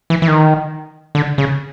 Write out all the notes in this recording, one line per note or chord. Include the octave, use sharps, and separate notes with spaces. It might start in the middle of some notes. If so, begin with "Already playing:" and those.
E3
E3
D#3
D3
C#3